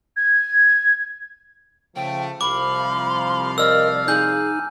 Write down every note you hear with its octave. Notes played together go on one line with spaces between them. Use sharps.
G#6
C#3 F3 A3 G5
C2 F3 F5 B5 D6
A#4 D5 D#5 E6 F6
D#4 G#4 G#5 G6